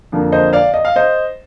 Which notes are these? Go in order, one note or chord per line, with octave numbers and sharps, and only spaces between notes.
F2 D3 F3 A#3
C5 D#5
D5 F5
D#5
F5
C5 D#5